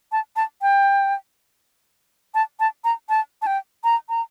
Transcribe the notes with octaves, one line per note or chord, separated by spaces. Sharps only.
A5
A5
G5
A5
A5
A#5
A5
A5
G5
A#5
A#5